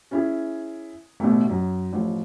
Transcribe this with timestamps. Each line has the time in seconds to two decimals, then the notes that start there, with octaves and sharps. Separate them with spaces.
0.11 C#4 E4 G#4
1.20 A1 B2 A3
1.49 F#2
1.92 A1 F3